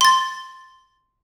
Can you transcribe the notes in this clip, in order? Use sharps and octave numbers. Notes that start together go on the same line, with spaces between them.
C6 A6